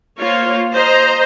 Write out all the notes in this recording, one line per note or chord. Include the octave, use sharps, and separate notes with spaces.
A#3 F4 C5 C#5
C5 D#5 A#5